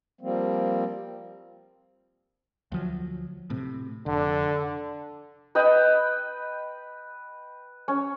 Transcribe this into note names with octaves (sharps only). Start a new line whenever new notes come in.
F3 G3 A#3 C4
D2 F3 F#3
A2 C3
F1 D3
B4 D#5 G5 B5
C#4